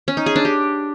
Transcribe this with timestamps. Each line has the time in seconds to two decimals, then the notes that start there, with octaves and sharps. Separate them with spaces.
0.08 C#4
0.17 D#4
0.26 G#4
0.36 D4
0.45 G4